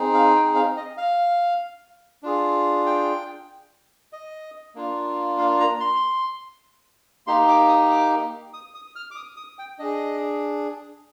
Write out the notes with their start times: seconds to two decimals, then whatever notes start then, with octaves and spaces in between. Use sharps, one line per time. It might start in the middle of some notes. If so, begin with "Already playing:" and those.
Already playing: C4 D#4 G#4
0.14 F5
0.35 G5
0.55 F5
0.77 D#5
0.97 F5
2.23 D4 F4 G#4
2.86 G5
4.13 D#5
4.75 A#3 D4 F4
5.38 F5
5.60 A#5
5.80 C6
7.27 A#3 D#4 G4 C6
7.48 D6
7.69 D#6
7.91 D6
8.53 D#6
8.74 D#6
8.96 F6
9.11 D6
9.16 D#6
9.36 D#6
9.59 G5
9.79 D4 G#4 D#5